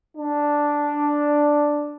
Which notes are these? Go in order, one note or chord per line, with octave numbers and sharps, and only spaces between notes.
D4